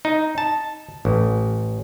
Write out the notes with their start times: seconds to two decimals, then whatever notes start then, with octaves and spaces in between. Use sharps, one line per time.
0.05 D#4
0.38 A5
1.05 A1